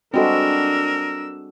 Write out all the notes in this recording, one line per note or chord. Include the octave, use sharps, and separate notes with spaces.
G3 G#3 C4 D4 F#4 A4 A#4 E6